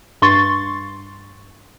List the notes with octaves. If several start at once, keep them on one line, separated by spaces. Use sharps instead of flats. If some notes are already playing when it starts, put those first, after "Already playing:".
G2 C6 C#6 A6